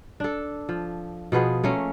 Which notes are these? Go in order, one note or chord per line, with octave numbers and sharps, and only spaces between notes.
D4 A4
F3
B2 F3 B3 G#4
A3 A#3 C#4